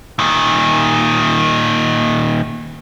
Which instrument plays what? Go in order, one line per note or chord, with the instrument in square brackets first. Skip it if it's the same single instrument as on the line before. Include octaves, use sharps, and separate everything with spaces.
[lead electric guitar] A#2 D#3